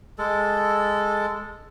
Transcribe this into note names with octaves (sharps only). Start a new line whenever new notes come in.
G#3 A4